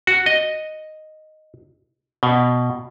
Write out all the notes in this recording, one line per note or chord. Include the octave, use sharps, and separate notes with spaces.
F#4
D#5
B2